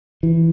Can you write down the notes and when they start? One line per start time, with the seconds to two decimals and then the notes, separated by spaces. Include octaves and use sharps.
0.23 E3